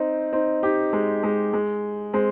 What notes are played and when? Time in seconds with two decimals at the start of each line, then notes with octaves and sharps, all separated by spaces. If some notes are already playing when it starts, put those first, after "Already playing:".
Already playing: C4 D#4
0.32 C4 D#4
0.63 D#4 G4
0.93 G#3
1.23 G#3
1.53 G#3
2.14 G#3 C4